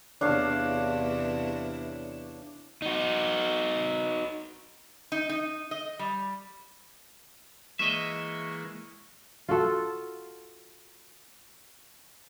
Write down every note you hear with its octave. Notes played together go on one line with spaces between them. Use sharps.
E2 C3 D4 E4 C#5 F5
D#4 F#4
D#4
D#4
D#5
G3
E3 G#3 A#3 D#5 E5 C#6
F4 F#4 A4